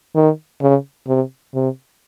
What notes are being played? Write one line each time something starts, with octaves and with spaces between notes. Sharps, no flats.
D#3
C#3
C3
C3